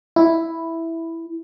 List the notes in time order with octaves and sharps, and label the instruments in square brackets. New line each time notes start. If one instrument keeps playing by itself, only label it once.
[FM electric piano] E4